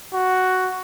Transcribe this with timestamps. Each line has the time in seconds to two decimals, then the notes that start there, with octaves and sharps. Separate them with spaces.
0.13 F#4